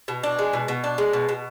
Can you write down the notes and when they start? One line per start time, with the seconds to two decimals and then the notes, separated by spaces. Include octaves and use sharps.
0.08 B2
0.23 D4
0.39 G#3
0.53 B2
0.68 B2
0.84 D4
0.98 G#3
1.13 B2
1.29 B2